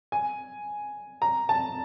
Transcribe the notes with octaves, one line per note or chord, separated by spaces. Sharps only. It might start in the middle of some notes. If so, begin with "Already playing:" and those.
G#5
A#5
A5